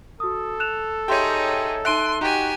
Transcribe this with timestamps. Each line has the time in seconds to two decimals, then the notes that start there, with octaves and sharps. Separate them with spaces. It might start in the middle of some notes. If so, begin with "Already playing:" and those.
0.20 F#4 A4 D#6
0.60 F#6 E7 F7
1.08 D#4 G4 G#4 C#5 E5 G5 C6 G6
1.85 D#4 E5 C6 F#6 D7 D#7
2.21 D#4 F#4 G4 G#5 A#5